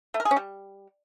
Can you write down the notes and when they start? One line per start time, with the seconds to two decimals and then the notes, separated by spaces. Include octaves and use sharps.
0.14 A3
0.20 A#4
0.25 G#4
0.31 C#4
0.36 G3